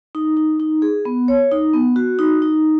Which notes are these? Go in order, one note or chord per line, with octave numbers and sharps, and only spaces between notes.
D#4
D#4
D#4
G#4
B3
C#5
D#4
B3
F#4
D#4
D#4